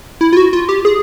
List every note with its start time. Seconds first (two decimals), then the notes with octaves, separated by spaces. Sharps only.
0.21 E4
0.33 F4
0.37 F#4
0.53 F4
0.69 G4
0.85 G#4